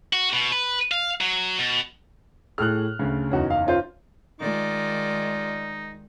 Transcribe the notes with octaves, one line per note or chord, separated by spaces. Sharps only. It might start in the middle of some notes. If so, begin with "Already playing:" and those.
F#4
B2
B4
F5
F#3
B2
A2 G4 G#4 F6 F#6
D2 C#3
F#1 E2 C#4 D#4 F#4
F5
C#4 F4 C5
D#3 G#3 D#4 F4 D5